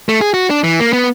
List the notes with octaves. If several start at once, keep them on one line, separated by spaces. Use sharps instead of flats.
A3
G#4
F#4
D4
E3
A#3
B3